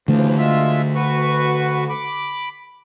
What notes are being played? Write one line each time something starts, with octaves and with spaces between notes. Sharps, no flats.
D#2 D3 E3 F3 A3
G#3 F4 E5
F#4 B4 C#6
B5 D6